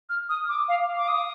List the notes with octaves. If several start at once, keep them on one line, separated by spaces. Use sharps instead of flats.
F6
D#6
D6
F5
D6
D#6